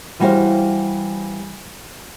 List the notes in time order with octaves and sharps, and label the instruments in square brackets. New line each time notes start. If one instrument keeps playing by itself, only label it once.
[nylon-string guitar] E3 G3 F#4 A#4 C5 F5